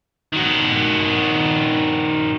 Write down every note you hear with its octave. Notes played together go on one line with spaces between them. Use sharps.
D#3 F#4